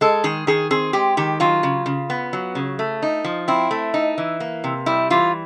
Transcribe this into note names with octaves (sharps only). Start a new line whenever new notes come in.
G#3 A4
D#3 G#4
D#3 G#4
C4 G#4
G#3 G4
D#3 G4
F#3 F4
C#3
C#3
B3
F#3
C#3
A3
D#4
F3
C4 E4
A3
D#4
E3
A#3
C3
G3 E4
E3 F4